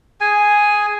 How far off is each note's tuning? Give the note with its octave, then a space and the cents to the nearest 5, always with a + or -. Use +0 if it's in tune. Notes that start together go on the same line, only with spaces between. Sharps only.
G#4 +0 G#5 +0